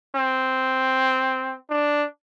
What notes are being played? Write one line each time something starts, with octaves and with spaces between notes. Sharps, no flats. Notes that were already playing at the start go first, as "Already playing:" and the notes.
C4
D4